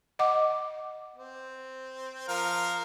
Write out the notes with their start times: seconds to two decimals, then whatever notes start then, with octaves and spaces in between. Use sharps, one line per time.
0.19 D#5 F#5 D6
1.16 C4
2.29 F3 A#4 F5